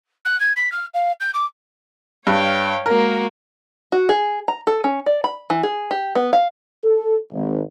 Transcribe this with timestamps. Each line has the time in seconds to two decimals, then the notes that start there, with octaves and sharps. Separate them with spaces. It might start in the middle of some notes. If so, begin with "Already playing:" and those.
0.25 F#6
0.40 G#6
0.56 B6
0.72 F6
0.94 F5
1.20 G6
1.34 D6
2.27 G2 C#5 F5 G5
2.86 G#3 A#3 F#4 A#4
3.92 F#4
4.09 G#4
4.48 A#5
4.67 A4
4.84 C#4
5.06 D5
5.24 B5
5.50 E3
5.63 G#4
5.91 G4
6.15 B3
6.33 F5
6.83 A4
7.32 G#1